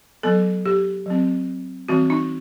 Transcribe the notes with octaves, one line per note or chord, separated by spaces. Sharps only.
F#3 B3 A4
G4
F#3 C4
E3 G3 C4 F#4
D#4